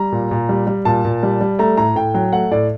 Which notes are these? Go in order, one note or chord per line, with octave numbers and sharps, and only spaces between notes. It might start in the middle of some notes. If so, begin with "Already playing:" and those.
Already playing: G3 A#5
A#2
A#2
G3
G3
A#2 A5
A#2
G3
G3
A3 A#5
A2 A#5
A2 G5
F#3 G5
A3 F#5
A2 D5